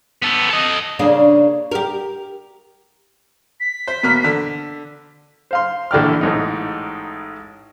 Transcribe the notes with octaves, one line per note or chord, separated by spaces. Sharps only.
B3 A4
A4 D#5
C#3 A#3 D4
G4 A#4
B6
C5
B2 A#3 F6
D3
C5 F5 C6
A#1 D3 E3 D5 G5 F6
A1 G#2 D#4